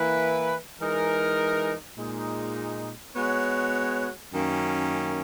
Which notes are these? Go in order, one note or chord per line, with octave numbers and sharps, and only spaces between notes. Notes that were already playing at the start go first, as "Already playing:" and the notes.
Already playing: E3 A#3 E4 B4
E3 G#3 D#4 A#4
A#2 G#3 D#4
G#3 B3 F#4 C#5
F#2 D#3 A#3 C#4